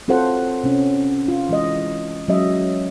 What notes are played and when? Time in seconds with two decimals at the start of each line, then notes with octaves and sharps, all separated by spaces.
0.08 C4 F4 A4 C5 F#5
0.63 C3 C#4
1.28 F4
1.49 E3 G#3 D#5
2.28 F#3 G#3 C#4 D#5 E5